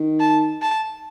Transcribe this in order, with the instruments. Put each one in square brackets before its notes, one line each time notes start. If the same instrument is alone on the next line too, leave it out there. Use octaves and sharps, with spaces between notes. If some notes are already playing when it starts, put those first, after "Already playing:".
Already playing: [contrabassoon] D#3
[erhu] A5
A5